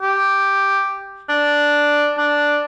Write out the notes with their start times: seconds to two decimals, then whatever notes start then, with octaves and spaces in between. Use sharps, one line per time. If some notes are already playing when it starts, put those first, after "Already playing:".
0.02 G4
1.29 D4
2.18 D4